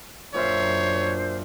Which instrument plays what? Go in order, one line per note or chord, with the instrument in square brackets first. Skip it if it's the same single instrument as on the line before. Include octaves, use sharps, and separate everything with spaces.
[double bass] F#2 D4 [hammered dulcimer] A#2 F4 E5 [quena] C5 [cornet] C#5